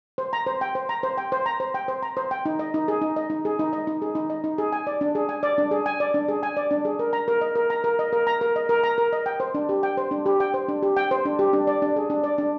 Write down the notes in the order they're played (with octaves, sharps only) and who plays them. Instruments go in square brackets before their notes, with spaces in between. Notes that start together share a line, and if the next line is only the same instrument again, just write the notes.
[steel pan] C5
A#5
C5
G5
C5
A#5
C5
G5
C5
A#5
C5
G5
C5
A#5
C5
G5
D#4
D#5
D#4
G#4
D#4
D#5
D#4
G#4
D#4
D#5
D#4
G#4
D#4
D#5
D#4
G#4
G#5
D5
D4
G#4
G#5
D5
D4
G#4
G#5
D5
D4
G#4
G#5
D5
D4
G#4
A#4
A#5
A#4
D#5
A#4
A#5
A#4
D#5
A#4
A#5
A#4
D#5
A#4
A#5
A#4
D#5
G5
C5
D4
G4
G5
C5
D4
G4
G5
C5
D4
G4
G5
C5
D4
G4
D4
D5
D4
G#4
D4
D5
D4